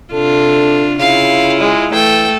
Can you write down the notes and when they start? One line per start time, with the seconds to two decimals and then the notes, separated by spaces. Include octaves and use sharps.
0.13 C3 D4 F4 A4
1.00 C#3 E4 F4 F5
1.60 G#3
1.93 E3 A3 A4 G5